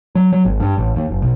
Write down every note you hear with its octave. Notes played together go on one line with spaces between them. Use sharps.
F#3
F#3
G#1
G2
A1
D#2
F#1
B1